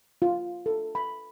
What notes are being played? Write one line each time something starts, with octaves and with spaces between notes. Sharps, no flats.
F4
A4
B5